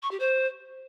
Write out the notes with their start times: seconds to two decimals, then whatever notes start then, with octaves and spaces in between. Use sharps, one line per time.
0.02 C#6
0.11 G4
0.19 C5